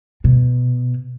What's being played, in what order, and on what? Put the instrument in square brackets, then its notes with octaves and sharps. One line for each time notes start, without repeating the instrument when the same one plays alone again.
[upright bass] B2